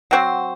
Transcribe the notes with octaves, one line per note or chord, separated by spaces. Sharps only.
F#3 C4 F#4 C5